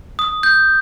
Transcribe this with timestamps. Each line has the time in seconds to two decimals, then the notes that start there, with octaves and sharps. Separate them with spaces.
0.19 D#6
0.43 G6